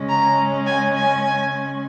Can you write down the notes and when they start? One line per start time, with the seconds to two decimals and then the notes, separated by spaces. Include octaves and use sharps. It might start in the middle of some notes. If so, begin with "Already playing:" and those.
Already playing: C#3 G#3 C#4
0.08 A#5
0.66 G#5
0.94 G#5